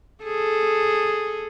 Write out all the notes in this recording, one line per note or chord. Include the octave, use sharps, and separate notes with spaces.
G#4 A4